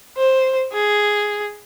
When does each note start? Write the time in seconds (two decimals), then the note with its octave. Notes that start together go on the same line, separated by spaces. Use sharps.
0.17 C5
0.73 G#4